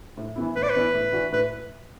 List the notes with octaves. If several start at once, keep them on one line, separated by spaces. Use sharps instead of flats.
A2
E3 B3 E4
A2 B4
D5
B4
E3 B3 E4
A2
E3 D4 F#4
A2 B4